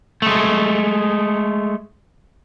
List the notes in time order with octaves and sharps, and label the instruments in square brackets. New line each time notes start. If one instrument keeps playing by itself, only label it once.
[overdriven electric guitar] G#3 A3